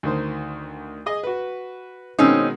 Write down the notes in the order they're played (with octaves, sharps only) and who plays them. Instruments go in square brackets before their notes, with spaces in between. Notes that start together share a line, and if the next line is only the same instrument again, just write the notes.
[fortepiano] D2 D#3 C5
G#4 D#5
F#4 B4
[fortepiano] B2 D#3 G#3 [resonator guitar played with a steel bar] C4 C#4 D#4